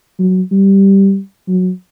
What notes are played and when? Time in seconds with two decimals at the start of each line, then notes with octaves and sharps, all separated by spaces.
0.19 F#3
0.51 G3
1.48 F#3